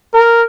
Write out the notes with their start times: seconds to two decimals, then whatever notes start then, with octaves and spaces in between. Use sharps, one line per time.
0.14 A#4